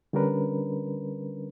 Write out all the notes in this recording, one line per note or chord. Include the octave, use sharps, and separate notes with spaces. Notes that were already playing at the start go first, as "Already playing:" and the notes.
D3 G3 C#4 D4 A#4 B4